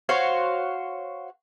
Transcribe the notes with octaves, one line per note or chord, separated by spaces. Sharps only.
F#4 C5 C#5 F5